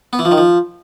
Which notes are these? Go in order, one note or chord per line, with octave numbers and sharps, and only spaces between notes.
B3
E3
F3
D#3
F3